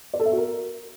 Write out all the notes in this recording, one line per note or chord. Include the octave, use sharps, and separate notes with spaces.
D5
A4
E5
F#4
A#4